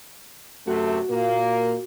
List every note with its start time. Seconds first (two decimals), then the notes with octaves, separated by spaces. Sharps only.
0.67 F#2 C3 A3 F#4
1.10 A#2 A#3